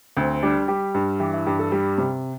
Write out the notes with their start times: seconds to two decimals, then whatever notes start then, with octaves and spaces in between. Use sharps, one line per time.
0.17 D2 C4
0.43 G3 D4
0.68 G3 G4
0.94 G2
1.20 E3 G4
1.34 E4
1.46 G2 G4
1.59 A4
1.72 G3 G4
1.98 C3